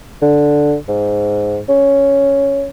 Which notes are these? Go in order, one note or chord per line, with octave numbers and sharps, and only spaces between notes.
D3
G#2
C#4